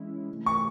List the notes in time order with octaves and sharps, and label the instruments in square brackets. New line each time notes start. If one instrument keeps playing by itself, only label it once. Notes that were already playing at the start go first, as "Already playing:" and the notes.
Already playing: [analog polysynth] E3 G#3 C#4 E4
C3 E3 A3
[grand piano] C#6